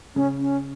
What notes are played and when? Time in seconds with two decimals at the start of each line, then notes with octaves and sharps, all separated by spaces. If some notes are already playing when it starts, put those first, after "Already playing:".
0.15 C#3 C#4
0.38 C#4